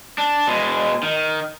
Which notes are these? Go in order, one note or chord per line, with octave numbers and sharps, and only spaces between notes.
D4
B2 G#3
D#3